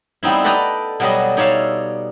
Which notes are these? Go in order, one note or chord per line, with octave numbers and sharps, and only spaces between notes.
G3 B3 C4 D#4 E4
A4 B4 D5 D#5 G5 A#5
B2 F#3 G3 D#5
D#4 C#5 D5 E5 F5